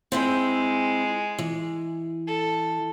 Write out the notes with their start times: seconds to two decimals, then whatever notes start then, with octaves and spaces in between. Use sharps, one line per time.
0.12 G#3 C4 E4 G5
1.39 E3
2.27 A4